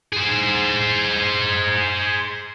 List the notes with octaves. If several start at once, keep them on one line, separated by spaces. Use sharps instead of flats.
G#4 C5